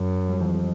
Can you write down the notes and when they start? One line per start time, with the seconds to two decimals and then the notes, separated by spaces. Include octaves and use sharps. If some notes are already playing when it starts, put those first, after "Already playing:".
Already playing: F#2
0.29 G3
0.40 F2 E3 F#3